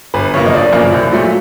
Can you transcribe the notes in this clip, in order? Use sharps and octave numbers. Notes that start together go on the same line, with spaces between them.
G1 B4
F#2 C#3 F3 A#3 C#5
D#5
G1 D5
F#2 C#3 F3 A#3
C2
A#2 F#3 A3